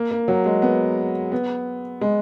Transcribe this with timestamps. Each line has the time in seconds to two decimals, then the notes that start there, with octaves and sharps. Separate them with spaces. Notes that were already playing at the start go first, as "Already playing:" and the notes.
Already playing: A#3
0.11 A#3
0.28 F#3
0.46 G#3
0.62 B3
1.32 B3
2.01 G#3